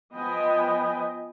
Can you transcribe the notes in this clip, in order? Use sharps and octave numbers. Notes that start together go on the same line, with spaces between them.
F3 B3 D#5 G5 G#5 B5